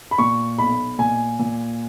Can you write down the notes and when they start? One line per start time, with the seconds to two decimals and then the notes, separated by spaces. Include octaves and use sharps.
0.11 B5
0.18 A#2 C#6
0.58 B1 B5
0.99 A#2 G#5
1.39 A#2